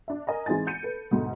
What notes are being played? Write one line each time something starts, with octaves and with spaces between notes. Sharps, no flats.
D4 E5
A#4 D#5 G#5 A#5
E3 G#3 C4 D#4 G#5 A6
G6 C#7 D#7
A4 B4
D2 G#2 B2